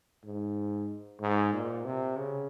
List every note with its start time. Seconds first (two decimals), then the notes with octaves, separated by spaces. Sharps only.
0.24 G#2
1.21 G#2
1.53 A#2
1.85 C3
2.17 C#3